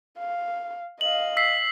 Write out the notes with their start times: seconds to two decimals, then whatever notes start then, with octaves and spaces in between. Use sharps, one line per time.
0.19 F5
1.01 D#5 F5 F#7
1.37 E6 B6 C7